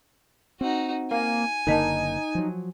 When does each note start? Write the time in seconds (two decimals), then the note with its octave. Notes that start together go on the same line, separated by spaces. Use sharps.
0.61 C4 D#4 F#4
1.11 A#3 F5 G#5
1.67 F#1 D3 A#3 D#4 A#4 D#5 A5
2.35 F3 F#3